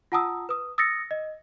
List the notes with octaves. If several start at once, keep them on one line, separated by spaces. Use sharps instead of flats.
F4 F#5 A5 A#5 D#6 E6
B4 D#6
D#6 E6 A6 A#6 C#7
D#5